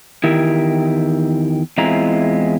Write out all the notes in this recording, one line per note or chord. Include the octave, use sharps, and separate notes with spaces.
E2 D#3 E4 G4 A#4
E2 G#3 C4 E4 F4 A#5